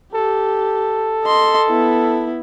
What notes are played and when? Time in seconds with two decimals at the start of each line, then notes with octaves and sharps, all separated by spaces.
0.15 G4 A4
1.24 D#5 C6
1.69 B3 E4